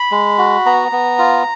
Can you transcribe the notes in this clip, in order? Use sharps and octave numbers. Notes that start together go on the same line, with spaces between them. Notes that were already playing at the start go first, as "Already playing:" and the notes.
Already playing: B5
G#3
F#4
B3 A#5
B3
F4